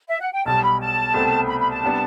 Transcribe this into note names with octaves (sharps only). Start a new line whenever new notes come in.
E5
F#5
G5
B1 B2 G3 A5
B5
A5
C2 B2 A3 C4
B5
B5
A5
C3 G3 B3 D4